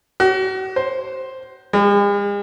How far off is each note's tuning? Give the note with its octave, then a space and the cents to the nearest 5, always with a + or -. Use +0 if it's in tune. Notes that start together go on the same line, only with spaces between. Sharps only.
F#4 +40
C5 +5
G#3 -45